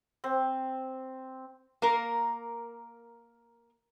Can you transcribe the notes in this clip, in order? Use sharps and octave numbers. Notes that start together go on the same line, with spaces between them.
C4
A#3 A#4